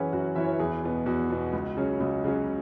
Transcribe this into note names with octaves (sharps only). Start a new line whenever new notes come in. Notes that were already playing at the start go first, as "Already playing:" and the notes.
Already playing: F#2 E3 C#4 E4 G#4 B4 F#5
F#2 F#4
E3 C#4 E4 E5
C#5
B4
E2 G#4
B2 B3
E2 F#4
B2 B3
C#2
C#3 F#3 C#4
C#2
C#3 F#3 C#4